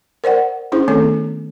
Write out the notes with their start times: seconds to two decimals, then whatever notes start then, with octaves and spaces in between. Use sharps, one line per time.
0.24 A#4 C5 D5 F#5
0.72 C#4 D4 E4 G#4 C5
0.88 D#3 A3 B3 C4 A4 C#5